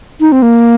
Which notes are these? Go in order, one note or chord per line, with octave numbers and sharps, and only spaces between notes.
D#4
C4
A#3